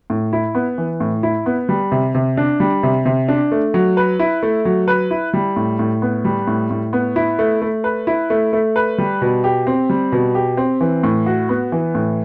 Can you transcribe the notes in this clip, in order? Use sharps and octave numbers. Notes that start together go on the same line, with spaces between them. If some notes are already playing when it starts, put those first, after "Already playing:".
A2
E4
B3
E3
A2
E4
B3
G3
C3
C3
D4
G3
C3
C3
D4
A3
F#3
B4
E4
A3
F#3
B4
E4
G3
A2
A2
B3
G3
A2
A2
B3
E4
A3
A3
B4
E4
A3
A3
B4
G3
B2
G4
C4
G3
B2
G4
C4
E3
A2
F#4
B3
E3
A2